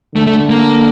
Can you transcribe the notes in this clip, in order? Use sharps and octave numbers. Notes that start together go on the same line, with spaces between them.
D3 A3
A3
A#3